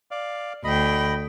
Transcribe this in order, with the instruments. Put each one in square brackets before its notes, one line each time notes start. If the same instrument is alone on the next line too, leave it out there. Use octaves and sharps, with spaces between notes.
[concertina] D5 F5
[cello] D2 G5 [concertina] D#5 B5